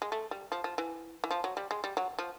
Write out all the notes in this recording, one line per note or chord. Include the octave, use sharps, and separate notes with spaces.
G#3
A3
G3
F3
F3
E3
E3
F3
F#3
G3
G#3
G3
F#3
F3